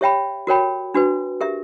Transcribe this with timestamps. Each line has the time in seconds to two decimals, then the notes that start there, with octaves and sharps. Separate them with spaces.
0.01 G4 C#5 E5 G5 B5
0.47 F#4 A#4 C#5 G5 B5
0.94 D4 F#4 B4
1.41 G4 A#4 E5